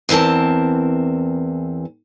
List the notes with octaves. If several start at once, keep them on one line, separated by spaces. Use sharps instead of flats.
E2 E3 C4 A#4 A5